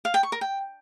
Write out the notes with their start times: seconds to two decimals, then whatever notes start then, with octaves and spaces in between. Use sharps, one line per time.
0.05 F5
0.14 G5
0.23 C#6
0.32 A#4
0.41 G5